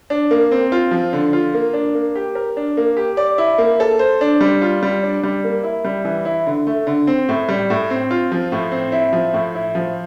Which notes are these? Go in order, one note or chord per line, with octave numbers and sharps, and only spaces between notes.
D4
A#3
C4
F4
F3
D3
F4
A#3
D4
A#3
G4
A#4
D4
A#3
G4
D5
E4
A#3
A4
C5
D4
G3
F4
G3
D4
G3
A#3
E4
G3
E3
E4
D3
A3
D3
C4
A2
G3
A2
C4
F4
F3
A2
C4
E4
F3
A2
E4
F3